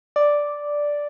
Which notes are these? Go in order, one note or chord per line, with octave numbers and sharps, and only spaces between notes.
D5